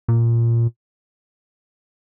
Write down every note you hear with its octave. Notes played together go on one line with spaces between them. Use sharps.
A#2